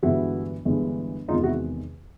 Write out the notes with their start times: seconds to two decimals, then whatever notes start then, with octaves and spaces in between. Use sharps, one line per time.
0.02 G1 G2 E3 G#3 E4 F#4
0.65 G1 G2 E3 G#3
1.28 E2 C3 D#3 G#3 D#4 F4
1.44 E4 F#4